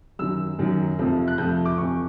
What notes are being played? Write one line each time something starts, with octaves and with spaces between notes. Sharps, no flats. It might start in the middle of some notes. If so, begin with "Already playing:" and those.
F#2 D#3 F#3 E6
F#2 D#3 F#3
F2 C3 F3 A3
F#6
F2 C3 F3 A3 G6
D6
F2 C3 E3 C#6